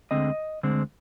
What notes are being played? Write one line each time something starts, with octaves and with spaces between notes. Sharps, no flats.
D2 D3 G#3 C4 D#5
D2 D3 G#3 C4